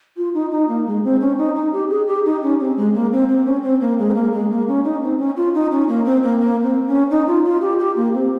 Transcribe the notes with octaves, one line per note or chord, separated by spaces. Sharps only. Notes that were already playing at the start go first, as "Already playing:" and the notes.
F4
D#4
D#4
A#3
G#3
C4
C#4
D#4
D#4
G4
G#4
G4
D#4
C#4
C4
G#3
A#3
C4
C4
C#4
C4
A#3
G#3
C4
A#3
G#3
A#3
C#4
D#4
C4
C#4
F4
D#4
C#4
A#3
C4
A#3
A#3
C4
C#4
D#4
F4
F4
G4
G4
A#3
C4